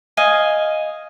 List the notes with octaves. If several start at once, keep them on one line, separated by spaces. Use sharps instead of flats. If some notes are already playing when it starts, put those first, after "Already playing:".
D#5 F5 G#5